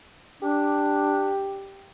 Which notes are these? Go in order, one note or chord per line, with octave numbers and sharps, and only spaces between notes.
D4 G4